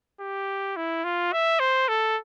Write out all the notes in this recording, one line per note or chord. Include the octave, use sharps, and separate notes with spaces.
G4
E4
F4
E5
C5
A4